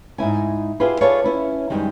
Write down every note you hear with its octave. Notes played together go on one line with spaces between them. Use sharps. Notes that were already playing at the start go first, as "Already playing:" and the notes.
G#2 D#4 E4 G#5
E4 F4 G4 G#4 B4
F4 G#4 A4 B4 C#5 D5
C#4 E4 B4
F#2 D#3 G3 G#3